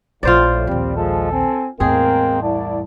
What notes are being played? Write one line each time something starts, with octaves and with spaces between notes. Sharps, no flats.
A#1 A2 F3 F4 C5 D5
A#1 D#2 G3 C4
F3 G#3 A4
C4 G#5
E2 A2 G#3 A#3 C4 G#4 A#4
C2 E4 D5 A5